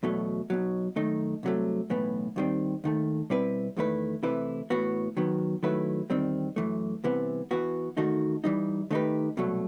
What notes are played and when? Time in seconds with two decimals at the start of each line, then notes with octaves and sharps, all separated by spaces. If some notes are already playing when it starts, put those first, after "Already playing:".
0.03 E2 B2 F#3 A3
0.50 B1 B2 F#3
0.96 F#2 D#3 A3 D#4
1.43 C2 C3 F#3 A3
1.90 B1 A2 E3 B3
2.36 D#2 D#3 G3 C4
2.84 D#2 D#3 A3
3.30 B2 G3 C4 E4 B4
3.77 E2 D#3 A3 E4 B4
4.23 C3 E3 A3 E4 B4
4.70 A2 E3 B3 F#4
5.17 D#3 F#3 B3
5.63 D#3 F#3 A3 E4 B4
6.10 E2 D#3 G3 C4
6.56 F#2 E3 A3
7.04 C2 C3 E3 B3
7.51 E3 B3 F#4
7.97 E2 D#3 A3 D#4 F#4
8.44 E3 G3 D#4
8.91 D#3 A3 D#4 G4 B4
9.37 C2 B2 F#3 A3